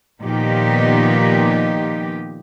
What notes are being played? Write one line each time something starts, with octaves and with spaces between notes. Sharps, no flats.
A#2 D#3 F3 B3 D#4 G4